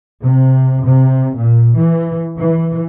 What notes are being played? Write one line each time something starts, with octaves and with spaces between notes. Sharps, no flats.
C3
C3
A#2
E3
E3